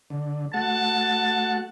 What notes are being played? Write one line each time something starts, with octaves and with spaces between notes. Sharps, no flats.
D3
A3 F#4 F#5 A5